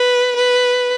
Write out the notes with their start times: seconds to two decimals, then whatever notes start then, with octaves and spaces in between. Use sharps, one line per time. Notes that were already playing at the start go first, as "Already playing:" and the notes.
Already playing: B4
0.36 B4